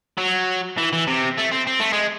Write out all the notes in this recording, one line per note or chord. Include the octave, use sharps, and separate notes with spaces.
F#3
E3
E3
C3
A3
C4
C4
A3
G#3